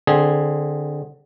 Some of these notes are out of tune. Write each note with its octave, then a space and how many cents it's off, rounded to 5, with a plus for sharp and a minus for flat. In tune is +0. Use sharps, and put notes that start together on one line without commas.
D3 +15 C4 +5 G#4 +0